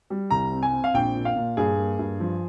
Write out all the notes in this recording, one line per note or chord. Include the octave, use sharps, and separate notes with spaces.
G3
C2 A#5
C4
G#5
C4
F5
A#1 G5
A#2
F5
A#2
G2 G#4
A#3
G2
F3